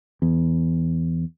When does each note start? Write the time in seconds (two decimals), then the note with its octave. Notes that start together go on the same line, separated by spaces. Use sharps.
0.22 E2